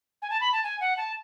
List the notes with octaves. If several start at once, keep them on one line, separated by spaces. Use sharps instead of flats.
G#5
A5
B5
A5
G#5
F#5
A5